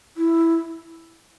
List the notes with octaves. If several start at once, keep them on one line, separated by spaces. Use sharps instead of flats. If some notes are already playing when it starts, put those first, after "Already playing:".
E4